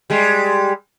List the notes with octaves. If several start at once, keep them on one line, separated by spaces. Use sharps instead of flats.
G3 G#3